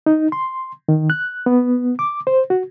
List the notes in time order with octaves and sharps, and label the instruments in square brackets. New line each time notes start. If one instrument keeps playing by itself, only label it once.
[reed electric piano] D#4
C6
D#3
F#6
B3
D6
C5
F#4